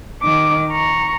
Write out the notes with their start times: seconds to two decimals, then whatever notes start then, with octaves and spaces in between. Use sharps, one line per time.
0.23 D#3 D6
0.71 A#5 C#6